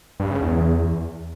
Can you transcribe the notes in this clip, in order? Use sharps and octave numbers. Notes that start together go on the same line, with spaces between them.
G2
C#3
E2